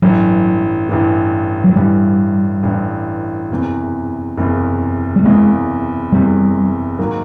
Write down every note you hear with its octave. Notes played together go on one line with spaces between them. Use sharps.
A1 G2 E3 F#3
A1 G2 E3
F#3
A1 G2 E3 G3
A1 G2 E3
F#1 E2 C3
F#1 E2 C3
G3
F#1 E2 C3 G#3
F#1 E2 C3 G3
G#2 D#3 F#3 A#3